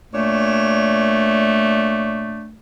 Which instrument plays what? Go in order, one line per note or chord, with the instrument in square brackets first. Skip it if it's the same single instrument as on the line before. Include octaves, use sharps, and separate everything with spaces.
[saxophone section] A#2 D4 C#5 [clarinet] A3